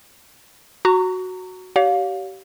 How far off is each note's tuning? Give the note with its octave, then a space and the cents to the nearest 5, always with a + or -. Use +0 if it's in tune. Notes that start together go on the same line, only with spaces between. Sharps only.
F#4 +0 A#5 -25 C#6 +30
G4 -35 C#5 +40 F5 +25